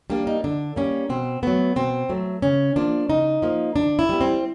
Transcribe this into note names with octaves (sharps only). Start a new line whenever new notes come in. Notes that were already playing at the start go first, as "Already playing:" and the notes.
G3 A#3 D4
D#4
D3 D4
G3 A#3 C#4
B2 C4
F#3 A3 B3
B2 C4
F#3 A3
C#3 C#4
F3 A#3 D4
C#3 D#4
F3 A#3
D3 D4
E4
G3 B3
C4